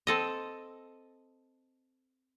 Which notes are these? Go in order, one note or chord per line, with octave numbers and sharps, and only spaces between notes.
C4 A4 D#5